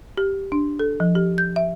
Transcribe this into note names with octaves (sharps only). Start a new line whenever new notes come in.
G4
D4
A4
F3
G4
G6
E5